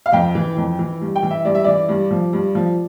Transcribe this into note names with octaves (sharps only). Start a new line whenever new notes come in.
F5
F2 G5
E3
F2
E3
G2
G5
E3
E5
G2 D5
E5
E3 D5
G2
F3
G2
F3